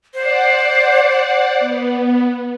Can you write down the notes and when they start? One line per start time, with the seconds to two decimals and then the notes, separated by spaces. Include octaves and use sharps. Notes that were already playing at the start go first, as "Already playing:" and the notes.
0.14 C5 D5 F#5
1.60 B3